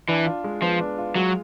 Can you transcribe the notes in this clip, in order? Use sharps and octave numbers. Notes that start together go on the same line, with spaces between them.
E3 D4
F4
G#3
F3 B3
D4
F4
F#3 G#3